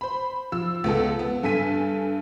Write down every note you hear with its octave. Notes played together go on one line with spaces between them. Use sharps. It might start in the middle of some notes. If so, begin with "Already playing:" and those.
C5 B5
F3 E6
C#2 B3 A4
B3
G2 A4 G#5 B6 D#7